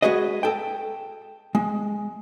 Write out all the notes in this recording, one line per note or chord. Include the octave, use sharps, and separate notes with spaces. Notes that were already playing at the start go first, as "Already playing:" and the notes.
G#3 F#4 G#4 B4 D#5
A4 G5
G#3